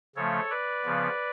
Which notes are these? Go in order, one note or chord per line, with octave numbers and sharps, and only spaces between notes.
C#3 F3 A3 A4 C#5
B4 D5
C#3 F3 B3